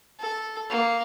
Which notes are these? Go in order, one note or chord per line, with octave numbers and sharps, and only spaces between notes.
A4
A#3